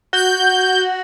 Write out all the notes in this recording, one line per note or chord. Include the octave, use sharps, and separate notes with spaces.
F#4 G6